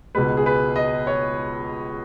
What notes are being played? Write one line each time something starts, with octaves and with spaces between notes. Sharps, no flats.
C#2 B2 G#3 B4
G#4
B4
D#5
C#5